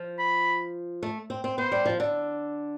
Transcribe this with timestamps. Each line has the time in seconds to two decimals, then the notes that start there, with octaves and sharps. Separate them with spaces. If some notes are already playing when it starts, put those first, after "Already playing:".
Already playing: F3
0.19 B5
1.03 A3
1.30 C4
1.44 C4
1.58 B3 C5
1.72 G3
1.86 F3
2.00 D3